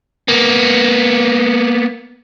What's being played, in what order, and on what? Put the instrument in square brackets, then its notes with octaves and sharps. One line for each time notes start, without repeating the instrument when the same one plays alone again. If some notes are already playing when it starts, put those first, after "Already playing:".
[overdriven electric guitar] A#3 B3